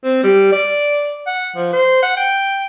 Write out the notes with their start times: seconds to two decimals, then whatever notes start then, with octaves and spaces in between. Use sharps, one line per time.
0.04 C4
0.23 G3
0.53 D5
1.27 F#5
1.56 F3
1.73 C5
2.03 F#5
2.17 G5